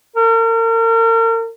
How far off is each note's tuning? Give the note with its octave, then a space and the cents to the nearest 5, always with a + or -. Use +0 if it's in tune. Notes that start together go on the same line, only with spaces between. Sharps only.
A#4 -40